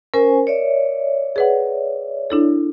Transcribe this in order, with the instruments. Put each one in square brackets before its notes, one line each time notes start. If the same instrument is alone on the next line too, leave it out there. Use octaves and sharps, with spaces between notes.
[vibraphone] C#4 C5 G#5 [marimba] A#4
[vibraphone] C#5 D5 E5
[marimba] G#4 B4 F#5
D4 E4 A4